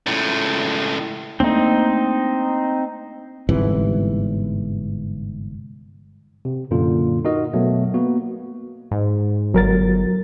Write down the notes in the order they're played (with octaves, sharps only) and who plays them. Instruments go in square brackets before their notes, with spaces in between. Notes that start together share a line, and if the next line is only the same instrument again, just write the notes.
[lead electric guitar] C#2 A2
[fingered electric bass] A3 A#3 D4 [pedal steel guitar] C4 D#4
[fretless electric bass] G1 G#2 C3 E3
[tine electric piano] C3
F#2 A#2 D3 A#3 F4
D#4 F#4 A#4 D#5
B2 F#3 A3 B3
A#3 B3 F#4
[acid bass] G#2
[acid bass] G1 [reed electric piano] F#3 A#4 A6